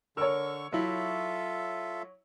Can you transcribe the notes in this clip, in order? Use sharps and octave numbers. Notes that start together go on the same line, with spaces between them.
D3 A#4 C#5 C#6 E6
F#3 E4 F4 A4 E5